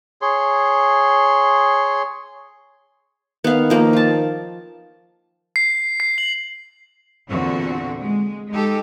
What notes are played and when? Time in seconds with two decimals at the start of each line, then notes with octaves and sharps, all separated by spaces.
0.22 G#4 C#5 C6
3.44 D#3 B3 F5
3.70 F3 A#3 A#4
3.93 F4 A5
5.56 C7
6.00 C7
6.18 F#7
7.27 E2 A#2 D3 C4 F#4
7.99 G#3
8.50 G#3 D#4 G4 A4